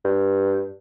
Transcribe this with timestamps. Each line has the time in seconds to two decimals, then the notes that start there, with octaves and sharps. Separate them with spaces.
0.05 G2